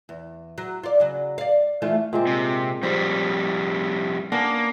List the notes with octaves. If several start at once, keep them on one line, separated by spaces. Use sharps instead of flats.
E2
F#3
F4 D5
C#3 F#3
D5 F5
E3 A3 F4
A#2 G#3 C4
C3
F2 G3 C5
A#3 B3 C#4 D4